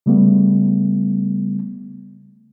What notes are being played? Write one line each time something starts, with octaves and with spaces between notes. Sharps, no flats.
C#3 G3 A3 B3